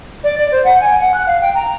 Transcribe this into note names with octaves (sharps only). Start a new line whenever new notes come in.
D5
D5
C5
F#5
G#5
F#5
F#6
F5
G5
A#5